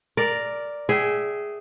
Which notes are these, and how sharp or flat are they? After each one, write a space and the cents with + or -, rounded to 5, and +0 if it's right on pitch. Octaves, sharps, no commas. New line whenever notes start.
A#4 +0 D5 +0
G#4 +0 E5 -5 G5 -30